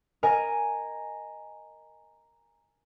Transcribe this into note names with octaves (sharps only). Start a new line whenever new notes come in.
A#4 D#5 G#5